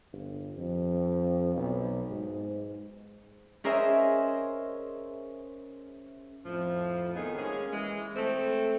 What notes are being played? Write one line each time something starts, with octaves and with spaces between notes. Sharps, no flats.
G1
F2
B1
G#2
C#4 G#4 A#4 C5 D#5 E5
F2 A2 F3
D#3 A3 B3 D#4 G#4
G#3 A#3 C#4 G#4
E3 G#3
A3 C4